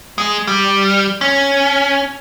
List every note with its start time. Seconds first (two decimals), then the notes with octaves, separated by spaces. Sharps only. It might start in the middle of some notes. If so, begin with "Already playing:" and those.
0.18 G#3
0.47 G3
1.21 C#4